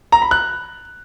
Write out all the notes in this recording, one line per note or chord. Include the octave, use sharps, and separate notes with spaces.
A#5
B5
F#6